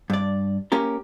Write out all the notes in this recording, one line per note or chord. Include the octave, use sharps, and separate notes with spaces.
G2 D5
A#3 C#4 G4 A#4